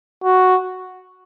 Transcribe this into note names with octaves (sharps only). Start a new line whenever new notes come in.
F#4